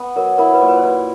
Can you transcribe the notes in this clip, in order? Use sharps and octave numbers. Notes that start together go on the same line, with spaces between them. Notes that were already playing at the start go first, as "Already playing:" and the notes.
Already playing: B3
F#3 A#4
E4 A#4
B4
A#2
B4
C5
E4 B4